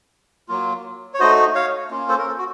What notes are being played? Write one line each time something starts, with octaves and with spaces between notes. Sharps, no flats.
F#3 A#3 F4
C#5
A3 D#4 F#4 C5 D#5
C#5 F5
A#3 C#4 F4
A4 C5
A#4
A4
F#4